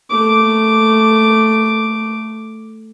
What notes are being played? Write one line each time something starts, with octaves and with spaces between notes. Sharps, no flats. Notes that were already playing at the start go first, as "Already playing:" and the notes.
A3 D6